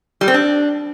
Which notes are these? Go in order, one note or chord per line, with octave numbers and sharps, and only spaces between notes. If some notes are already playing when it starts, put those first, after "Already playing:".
G3
C4
D4